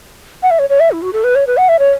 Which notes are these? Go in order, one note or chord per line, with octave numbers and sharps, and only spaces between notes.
F#5
E5
C#5
C#5
E5
E4
F#4
A4
B4
C#5
B4
F#5
E5
C#5